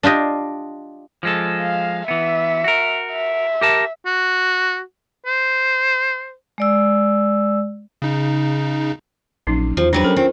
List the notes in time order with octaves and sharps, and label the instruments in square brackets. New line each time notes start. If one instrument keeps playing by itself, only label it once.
[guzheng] D4 F4 G4 D#5
[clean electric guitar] F3 G#3 A4
[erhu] F5
[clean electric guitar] E3 B3 [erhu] E5
[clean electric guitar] F#4 A#4
[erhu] E5
[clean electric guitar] G4 A#4 A5
[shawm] F#4
C5
[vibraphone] G#3 D5 E6
[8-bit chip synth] C#3 D#4
[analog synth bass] A#1 [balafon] F#3 C#4 D#4
[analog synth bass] E2 [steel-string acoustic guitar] F3 [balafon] F#4
[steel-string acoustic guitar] F#3 G3 B4 [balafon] D4 C5 G5
[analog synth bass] C#4 [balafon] A4 A#4
[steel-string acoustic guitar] C4 [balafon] F4